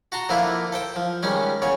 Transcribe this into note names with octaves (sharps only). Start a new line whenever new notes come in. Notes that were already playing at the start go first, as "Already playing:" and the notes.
F#4 A5 A#5 C6
D3 F3 A#3 D4 E4 F4
A4 C5 G5
F3
D#3 G3 G#3 C#4
E2 C#3 C#5